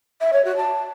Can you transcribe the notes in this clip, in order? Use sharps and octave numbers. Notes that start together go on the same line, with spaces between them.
E5
C#5
F#4
A5